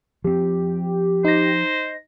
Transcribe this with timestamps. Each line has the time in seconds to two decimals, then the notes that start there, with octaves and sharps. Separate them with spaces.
0.24 F3 C4 G4
1.25 D#4 C5 A#6